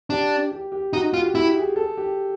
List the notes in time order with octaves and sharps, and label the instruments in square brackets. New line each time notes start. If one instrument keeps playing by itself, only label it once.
[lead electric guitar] D4 [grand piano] G4
[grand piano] G4
G4
[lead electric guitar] D#4 [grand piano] F#4
[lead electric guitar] F4
[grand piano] G4
[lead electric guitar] E4 [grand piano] G4
[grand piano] G#4
A4
G4